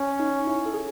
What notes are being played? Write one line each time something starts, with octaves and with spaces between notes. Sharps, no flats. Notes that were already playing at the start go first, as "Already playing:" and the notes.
Already playing: C#4
D#4
E4
A4
G#4